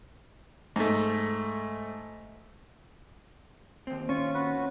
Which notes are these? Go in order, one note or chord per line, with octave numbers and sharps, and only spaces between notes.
G#2 A3
D#2 C4
C#4 F4 C#6
F#4 B4